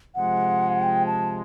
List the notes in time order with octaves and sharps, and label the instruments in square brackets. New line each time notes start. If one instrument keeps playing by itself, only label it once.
[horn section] C3 F3 G#3 [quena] F#5
[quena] G5
A5